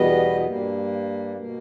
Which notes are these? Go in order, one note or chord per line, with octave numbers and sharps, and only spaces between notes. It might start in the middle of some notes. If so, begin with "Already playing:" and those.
Already playing: E2 B2 G3 B3 D#5
G2 G3 A#3
B2 A#3